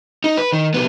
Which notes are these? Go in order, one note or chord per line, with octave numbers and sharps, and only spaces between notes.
D#4
B4
D#3
C2 B3